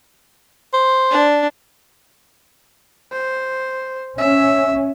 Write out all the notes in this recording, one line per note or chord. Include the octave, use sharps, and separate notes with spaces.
C5
D4
C5
C#4 E5